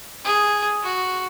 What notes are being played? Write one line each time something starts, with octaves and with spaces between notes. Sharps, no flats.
G#4
F#4